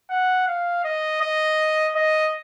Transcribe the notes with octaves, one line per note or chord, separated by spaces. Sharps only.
F#5
F5
D#5
D#5
D#5